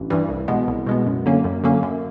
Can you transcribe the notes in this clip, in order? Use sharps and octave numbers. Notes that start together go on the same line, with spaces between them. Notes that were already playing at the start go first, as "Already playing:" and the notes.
Already playing: A1 G2 E3
G2 E3 G3
C2
B2 G#3 B3
C2
B2 G#3 B3
F#2
D3 F#3 A#3 C#4
F#2
D3 F#3 A#3 C#4
F#2